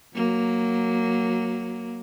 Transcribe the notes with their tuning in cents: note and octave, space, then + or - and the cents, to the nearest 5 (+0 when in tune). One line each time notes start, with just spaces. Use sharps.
F#3 +0 A#3 +0